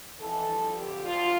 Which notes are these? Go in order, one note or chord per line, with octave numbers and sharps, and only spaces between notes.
F2 E3 A4
G2 F3
F2 D3 F3 G4
D2 D3 F3 F4